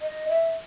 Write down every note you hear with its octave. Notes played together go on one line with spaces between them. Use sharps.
D#5
E5